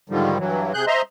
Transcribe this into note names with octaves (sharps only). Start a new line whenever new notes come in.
G#2 D3 D#3 F3 G3
G2 E3 F#3
C3 G#4 F#6 G6
C5 D#5 E5 A#5 C6